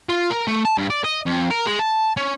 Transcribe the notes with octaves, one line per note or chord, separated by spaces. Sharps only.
F4
A#4
A3
A5
G2
D5
D#5
F2
A#4
G#3
A5
C#4